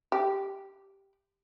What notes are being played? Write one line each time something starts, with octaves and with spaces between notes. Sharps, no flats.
G4